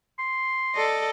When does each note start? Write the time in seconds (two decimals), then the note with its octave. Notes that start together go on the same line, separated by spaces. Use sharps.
0.19 C6
0.74 A4 D5 D#5